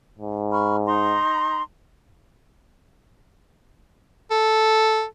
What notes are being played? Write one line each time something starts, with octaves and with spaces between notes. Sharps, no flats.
G#2
B5 C#6 F6
D#4 A#5 C6
A4